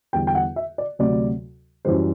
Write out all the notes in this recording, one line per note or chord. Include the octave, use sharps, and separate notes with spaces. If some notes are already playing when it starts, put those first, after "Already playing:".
E2 D3 G3 G5
G5
F#5
E5
D5
D2 C3 F#3 D5
F#2 E3 G3 C5